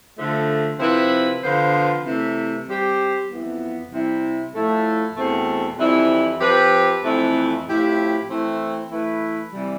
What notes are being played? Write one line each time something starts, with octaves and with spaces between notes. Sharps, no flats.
D3 F3 A3
C3 F3 C4 E4 B4
D3 F3 B3 F4 C5
C3 E3 A3
G3 C4 G4 C5
F2 E3 B3
C3 G3 C4 E4
A2 F3 A3 E4 A4
E2 B2 A3 C4
F2 E3 G3 C4 E4
F3 C4 G4 B4
F2 E3 A3 C4 E4
A2 F3 C4 E4 G4
E3 A3 C4 E4
E3 A3 E4 B4
C3 E3 G3